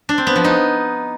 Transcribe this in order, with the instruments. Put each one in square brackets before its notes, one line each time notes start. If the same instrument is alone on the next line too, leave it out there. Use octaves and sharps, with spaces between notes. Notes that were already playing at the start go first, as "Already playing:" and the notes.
[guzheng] D4
C4
B3
F3
D#4